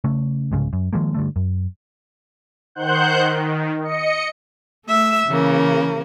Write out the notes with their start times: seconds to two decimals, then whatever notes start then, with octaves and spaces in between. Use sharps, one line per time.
0.04 C#3 A3 C#4
0.52 C2 G#2 C#3
0.73 F#2
0.93 D#3 F3 G#3 A#3
1.14 G2 D3 A3
1.36 F#2
2.75 D#3 C5 F#5 F#6 G6
3.20 D#3
3.82 D#5 C#7
4.86 A3 E5 E6
5.28 C#3 E3 A#3